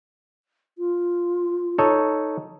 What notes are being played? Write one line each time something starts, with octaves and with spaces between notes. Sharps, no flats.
F4
D#4 A4 C#5